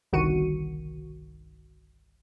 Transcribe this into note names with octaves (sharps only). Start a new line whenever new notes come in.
G1 C2 D#3 F#4 C#7 D#7